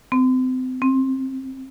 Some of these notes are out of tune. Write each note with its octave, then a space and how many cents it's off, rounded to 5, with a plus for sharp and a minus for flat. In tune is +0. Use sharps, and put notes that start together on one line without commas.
C4 -35
C4 +20